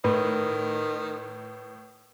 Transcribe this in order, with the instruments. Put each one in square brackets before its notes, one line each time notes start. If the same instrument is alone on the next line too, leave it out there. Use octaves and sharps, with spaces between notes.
[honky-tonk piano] A2 [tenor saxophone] D#3 [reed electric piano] B4